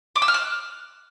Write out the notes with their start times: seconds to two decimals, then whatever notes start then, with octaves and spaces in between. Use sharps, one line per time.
0.16 D6
0.22 E6
0.28 F6
0.34 F#6